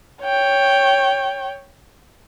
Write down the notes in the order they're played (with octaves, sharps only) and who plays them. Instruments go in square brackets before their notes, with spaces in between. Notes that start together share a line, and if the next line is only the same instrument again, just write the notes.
[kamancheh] C#5 G5